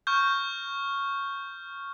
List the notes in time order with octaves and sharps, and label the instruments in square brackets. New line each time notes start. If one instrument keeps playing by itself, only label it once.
[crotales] C#6 F6 G6